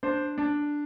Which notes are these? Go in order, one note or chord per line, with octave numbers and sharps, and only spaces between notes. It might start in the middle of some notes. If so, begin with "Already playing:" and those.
D4 C5
D4